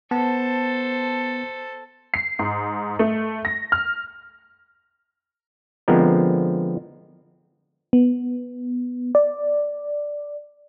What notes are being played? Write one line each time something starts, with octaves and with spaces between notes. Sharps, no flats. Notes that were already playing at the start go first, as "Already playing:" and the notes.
B3 A4 C5 A5
C7
G#2
A3
A#6
F6
D3 F3 G#3 B3 C4 A#4
B3
D5